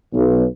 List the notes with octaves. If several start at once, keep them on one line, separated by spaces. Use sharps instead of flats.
B1